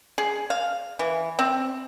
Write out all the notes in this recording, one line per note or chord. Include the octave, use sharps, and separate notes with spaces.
G#4
F5
E3
C4